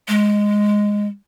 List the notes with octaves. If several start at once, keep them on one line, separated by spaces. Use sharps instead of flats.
G#3